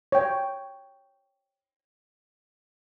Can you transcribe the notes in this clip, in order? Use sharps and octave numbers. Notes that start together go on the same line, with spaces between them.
C#5 G5